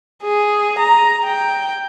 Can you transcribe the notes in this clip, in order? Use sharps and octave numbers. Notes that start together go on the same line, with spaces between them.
G#4
A#5
G5